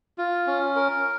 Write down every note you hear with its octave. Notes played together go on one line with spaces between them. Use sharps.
F4
C#4
A#4